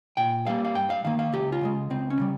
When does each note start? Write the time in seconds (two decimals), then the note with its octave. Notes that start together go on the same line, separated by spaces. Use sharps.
0.17 A#2 G5
0.47 G3 A#3 F5
0.65 F5
0.75 G2 G5
0.90 F5
1.05 D#3 A#3 F5
1.19 F5
1.32 C#2 G4
1.52 F4
1.61 C#3 F3 G#3
1.90 C#2 C4
2.10 C#4
2.20 C#3 G3